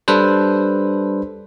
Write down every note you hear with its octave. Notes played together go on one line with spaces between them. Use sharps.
G3 D4 A4 B4 C5